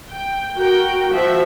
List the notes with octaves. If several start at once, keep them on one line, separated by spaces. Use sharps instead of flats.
G5
F#4 A#4 G5
F3 F#4 E5